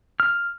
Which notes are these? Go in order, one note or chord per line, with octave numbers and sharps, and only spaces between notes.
F6